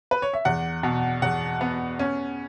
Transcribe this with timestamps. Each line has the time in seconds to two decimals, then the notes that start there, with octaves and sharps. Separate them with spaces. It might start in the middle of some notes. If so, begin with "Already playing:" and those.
0.11 B4
0.22 C#5
0.34 E5
0.45 E2 F#5
0.83 B2
1.22 E2 F#5
1.61 B3
1.99 C#4